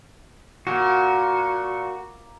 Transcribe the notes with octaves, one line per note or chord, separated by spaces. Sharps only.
A#2 F#4